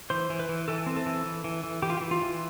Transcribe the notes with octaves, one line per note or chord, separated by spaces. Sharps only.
E3 C5
E3
B4
E3
E3 A4
C4
A4
E3
E3
E3
E3
E3 G4
F4
G4
E3
F4
E3